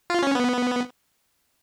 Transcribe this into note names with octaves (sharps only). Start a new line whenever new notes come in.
F4
C#4
B3